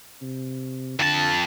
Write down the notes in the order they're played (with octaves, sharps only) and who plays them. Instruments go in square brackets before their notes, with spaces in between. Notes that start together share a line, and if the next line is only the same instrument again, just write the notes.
[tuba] C3
[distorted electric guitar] F2 A5 [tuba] D3